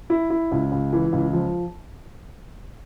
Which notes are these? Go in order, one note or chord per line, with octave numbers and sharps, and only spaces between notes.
E4
E4
C#2
C#2
E3
C#2
F3